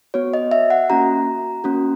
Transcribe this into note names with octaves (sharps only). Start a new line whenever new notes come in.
B3 F#4 C#5
D#5
E5
F#5
A#3 C#4 F#4 A#5
A#3 C#4 F#4